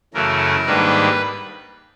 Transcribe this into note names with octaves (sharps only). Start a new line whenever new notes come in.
F#2 C#3 E3 A3 A#4
G#2 D#3 G3 A#3 D4 B4